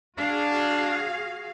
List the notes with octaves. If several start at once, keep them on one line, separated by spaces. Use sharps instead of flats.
D4 F#4 G#4 F5